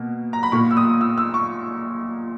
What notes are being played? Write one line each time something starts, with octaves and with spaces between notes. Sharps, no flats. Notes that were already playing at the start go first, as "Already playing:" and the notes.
Already playing: B2 A#3
A#5
B5
A#2 A#3 C#6
E6
D#6
E6
E6
C#6